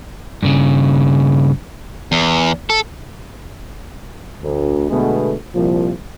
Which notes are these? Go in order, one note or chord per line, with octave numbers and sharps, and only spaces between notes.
G2 C#3
E2
A4
D2
B2 D3 G#3 A3 B3
C2 A#2 F3